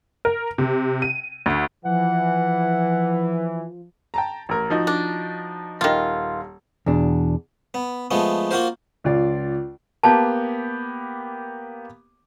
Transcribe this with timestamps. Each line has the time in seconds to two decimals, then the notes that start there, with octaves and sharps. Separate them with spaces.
0.25 A#4
0.58 C3
1.02 D#7
1.46 D2
1.85 E3 F3 F#5
4.14 G5 A5 A#5
4.49 A1 A#4
4.70 F3 D#4 F#4
4.87 D4
5.81 D#1 D#3 F4
6.86 E2 B2 D4
7.74 B3
8.11 F3 G#3 A3 B3
8.51 A#3 F4 F#4 A#4 C5
9.04 C#2 F4 D5
10.03 A#3 B3 G4 A5